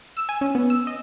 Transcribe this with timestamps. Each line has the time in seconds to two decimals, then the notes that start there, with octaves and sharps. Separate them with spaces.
0.17 E6
0.29 G#5
0.41 C#4
0.55 B3
0.70 E6
0.87 D#5